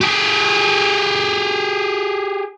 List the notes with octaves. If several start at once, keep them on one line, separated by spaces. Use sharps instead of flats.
G4 G#4